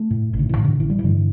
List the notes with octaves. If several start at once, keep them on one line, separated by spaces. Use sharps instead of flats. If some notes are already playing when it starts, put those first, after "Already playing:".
Already playing: A3
A2
A1
D3
E3
A2
D3
A1 E3
G3
E3
G2 D3